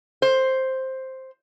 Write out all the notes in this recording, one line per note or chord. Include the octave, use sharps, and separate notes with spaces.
C5